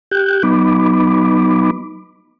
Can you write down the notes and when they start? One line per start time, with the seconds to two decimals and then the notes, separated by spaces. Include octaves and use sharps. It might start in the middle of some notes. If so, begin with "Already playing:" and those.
0.11 G4 F#6 G6
0.43 F#3 B3 D#4 B5 D6